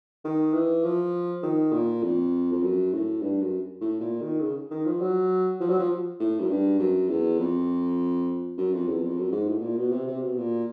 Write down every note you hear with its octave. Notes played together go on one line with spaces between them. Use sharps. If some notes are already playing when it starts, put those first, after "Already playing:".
D#3
E3
F3
D#3
A#2
F2
F2
F#2
A2
G2
F#2
A2
A#2
D#3
C#3
D#3
F3
F#3
F3
F#3
F3
A2
F#2
G2
F#2
E2
F2
F#2
F2
E2
F2
F#2
G#2
A2
A#2
B2
C3
C3
B2
A#2